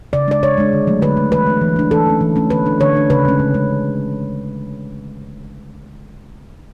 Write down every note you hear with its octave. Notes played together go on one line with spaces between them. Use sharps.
C#3 D5
G#3 D4 D5
C#3 C#5
G#3 D4
D3
F#3 A3
D3 B4
F#3 A3
E3 B4
A3 D4
E3
A3 D4
E3 A4
A3 C#4
E3
A3 C#4
D3 B4
A3 D4
D3 C#5
A3 D4
C#3 B4
G#3 C#4
C#3
G#3 C#4